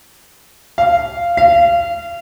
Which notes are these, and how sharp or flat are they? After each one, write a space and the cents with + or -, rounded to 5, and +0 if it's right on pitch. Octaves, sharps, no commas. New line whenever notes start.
F5 -10
F5 -25